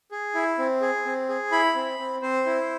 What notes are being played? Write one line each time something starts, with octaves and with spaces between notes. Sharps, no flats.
G#4
E4
C4
G#4
C4
G#4
E4 B5
C4
C4
C4 C5
E4